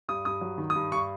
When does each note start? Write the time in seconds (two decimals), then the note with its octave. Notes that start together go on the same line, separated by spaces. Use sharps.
0.09 G2 D#6
0.25 G2 D#6
0.41 F#3
0.58 D#3
0.70 D#6
0.75 G2
0.92 G2 C#6